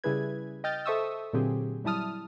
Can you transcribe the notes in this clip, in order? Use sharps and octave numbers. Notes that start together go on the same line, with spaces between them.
C#3 G3 E4 G#4 B4 G#6
D#5 G5 F6 G6 A6
A4 C5 E5 C#6 D#6 E6
A#2 D3 F#3 C4 G4 G#4
F#3 G3 E4 A5 D#6 F6